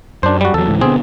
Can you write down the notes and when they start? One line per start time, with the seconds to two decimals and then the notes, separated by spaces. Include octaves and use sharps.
0.23 F#2 D4 C5
0.41 G3 F#4
0.54 E2 F#3 A4
0.68 C#2 G#2 E3
0.81 B2 D3 B3 C4 G#4